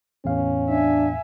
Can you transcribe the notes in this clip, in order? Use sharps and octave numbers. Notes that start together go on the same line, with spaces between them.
E2 A2 C#4 F5
D4 E5 G#5